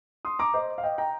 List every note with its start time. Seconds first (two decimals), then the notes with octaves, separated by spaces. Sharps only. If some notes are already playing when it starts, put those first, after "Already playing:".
0.25 C6 D#6
0.39 A#5 D6
0.54 C5 D#5
0.78 F5
0.83 D#5 G5
0.98 G5 A#5